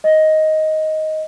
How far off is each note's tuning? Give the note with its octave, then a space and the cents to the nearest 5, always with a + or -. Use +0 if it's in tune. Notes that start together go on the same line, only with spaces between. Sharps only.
D#5 +10